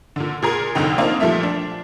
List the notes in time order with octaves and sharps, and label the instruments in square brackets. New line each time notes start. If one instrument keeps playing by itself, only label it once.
[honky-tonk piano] A#2 D3
A#2 G#4 A#4
F1 C2 D3 D#4 G5
A#3 C4 D4 D#4 F4
A#2 F3 G3 A3 E5
D4